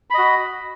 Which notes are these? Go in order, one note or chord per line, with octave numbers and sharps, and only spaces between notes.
F#4 D#5 B5